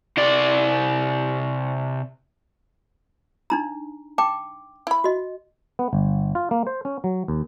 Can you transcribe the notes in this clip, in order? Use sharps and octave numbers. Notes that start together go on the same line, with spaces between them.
C3 D5
D4 D#4 A#5
G5 A5 D6
E4 B5
F#4 D#5
B3
G1
F4
A#3
C5
C#4
F#3
D#2